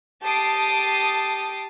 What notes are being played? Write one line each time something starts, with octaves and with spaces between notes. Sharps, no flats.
G4 A5 D#6 C7 D7